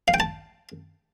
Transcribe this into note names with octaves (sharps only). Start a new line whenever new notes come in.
F5
G5
A5